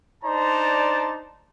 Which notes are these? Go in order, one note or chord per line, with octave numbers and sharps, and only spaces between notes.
D4 D#4 C5 D5 A5 A#5